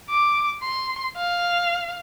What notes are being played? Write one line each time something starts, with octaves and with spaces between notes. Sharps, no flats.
D6
C6
F5